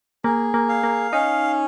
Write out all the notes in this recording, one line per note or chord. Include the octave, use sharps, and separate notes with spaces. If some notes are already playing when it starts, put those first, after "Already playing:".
A#3 G#4
A#3
F5
A#3
C#4 D#4